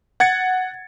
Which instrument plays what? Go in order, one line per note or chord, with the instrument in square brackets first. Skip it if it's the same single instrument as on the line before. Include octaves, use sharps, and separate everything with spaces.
[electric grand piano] F#5 G#6 A6 C#7